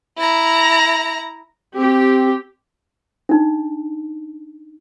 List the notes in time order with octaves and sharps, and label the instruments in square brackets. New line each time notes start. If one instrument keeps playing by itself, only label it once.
[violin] E4 A#5
[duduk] C4 [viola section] G4
[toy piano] D4 D#4